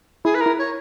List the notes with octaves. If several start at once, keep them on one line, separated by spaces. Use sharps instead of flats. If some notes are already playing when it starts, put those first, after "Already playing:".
E4 G#4
B4
A#4
E4
C#5